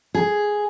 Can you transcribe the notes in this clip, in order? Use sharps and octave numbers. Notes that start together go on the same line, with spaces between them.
G#4